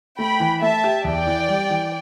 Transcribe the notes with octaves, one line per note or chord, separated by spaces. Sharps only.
A3 G5 B5
E3
A3 E5 A5
G4
E2 D5 G5
E3
G3
E3